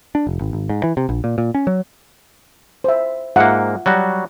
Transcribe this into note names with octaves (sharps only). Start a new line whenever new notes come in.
D4
F1
G#1
G#1
G#2
E3
C3
A#1
A#2
A#2
C#4
F#3
C5 E5
G#2 A#3 F4 E5 F#5
F#3 G3 F#4